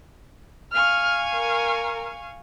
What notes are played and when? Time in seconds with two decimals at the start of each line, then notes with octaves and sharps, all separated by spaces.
0.72 F5 G#5 C#6 F6
1.34 A#4